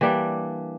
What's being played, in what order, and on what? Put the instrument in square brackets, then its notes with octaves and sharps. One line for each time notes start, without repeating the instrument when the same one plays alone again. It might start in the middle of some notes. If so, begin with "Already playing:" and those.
[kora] E3 G3 A#3 D4